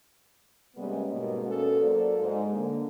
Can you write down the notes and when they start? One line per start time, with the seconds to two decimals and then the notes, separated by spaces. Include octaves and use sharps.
0.76 C3 G3 G#3 A#3 B3 C#4
1.09 G#2 B2 G#3 A#3
1.44 B2 A#3 B3 C#4 F#4 A4
1.79 F#3 A#3 A4 C5 D5
2.19 G#2
2.53 D3 A#3